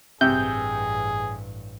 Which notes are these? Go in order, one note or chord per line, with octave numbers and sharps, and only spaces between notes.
A1 G2 C3 G#4 G6